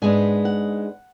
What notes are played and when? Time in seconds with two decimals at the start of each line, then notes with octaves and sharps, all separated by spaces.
0.02 G#2 G#3 B3 D4 G#5
0.45 F#5